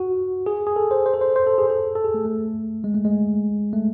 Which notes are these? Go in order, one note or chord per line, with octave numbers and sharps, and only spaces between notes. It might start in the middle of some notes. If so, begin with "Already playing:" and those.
Already playing: F#4
G#4
G#4
A4
C5
C5
A4
C5
C5
A4
G#4
A4
A4
G#4
A3
A3
G#3
A3
G#3
A3